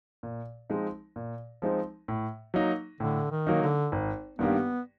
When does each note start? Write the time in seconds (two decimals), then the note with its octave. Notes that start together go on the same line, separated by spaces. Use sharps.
0.23 A#2
0.70 F3 G#3 C4 D#4
1.16 A#2
1.62 F3 G#3 C4 D#4
2.08 A2
2.54 F#3 A#3 D#4
3.00 A2 D3
3.31 D#3
3.47 F#3 A#3 D#4
3.62 D3
3.92 G#1
4.39 G2 D#3 G3 A#3 B3